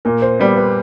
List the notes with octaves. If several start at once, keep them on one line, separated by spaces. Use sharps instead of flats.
A#2 A#4
C5
G3 B3
B4